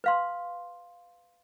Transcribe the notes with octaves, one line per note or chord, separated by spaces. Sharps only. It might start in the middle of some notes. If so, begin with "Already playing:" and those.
B4 F5 C6